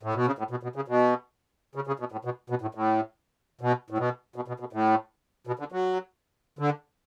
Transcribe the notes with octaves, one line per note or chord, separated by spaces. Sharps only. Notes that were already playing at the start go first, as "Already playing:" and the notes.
A2
B2
C#3
A2
B2
B2
C#3
B2
C#3
C#3
B2
A2
B2
B2
A2
A2
B2
A2
B2
B2
B2
B2
A2
B2
D3
F#3
D3